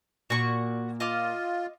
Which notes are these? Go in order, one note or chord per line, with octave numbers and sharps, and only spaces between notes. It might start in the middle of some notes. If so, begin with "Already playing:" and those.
A#2 F#4 C#6
F4 D#5 D6 F6